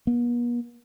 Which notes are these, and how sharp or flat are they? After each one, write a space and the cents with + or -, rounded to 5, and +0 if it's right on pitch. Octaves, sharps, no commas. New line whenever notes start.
B3 -45